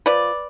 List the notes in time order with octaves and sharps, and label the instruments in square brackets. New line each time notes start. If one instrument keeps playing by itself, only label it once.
[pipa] F3 B4 D5